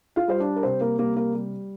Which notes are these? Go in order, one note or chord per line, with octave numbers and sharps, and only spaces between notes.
F4 F5
G3 C5
D4 D5
A#4
C3 C4 C5
A#3 A#4
G3 A#3 A#4
A#3 A#4
G3